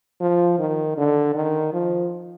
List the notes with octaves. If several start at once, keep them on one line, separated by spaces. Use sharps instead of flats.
F3
D#3
D3
D#3
F3